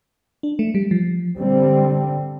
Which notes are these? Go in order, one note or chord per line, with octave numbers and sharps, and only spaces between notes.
D4
A3
G3
F3
D3 G3 C4